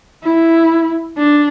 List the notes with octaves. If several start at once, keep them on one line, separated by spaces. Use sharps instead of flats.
E4
D4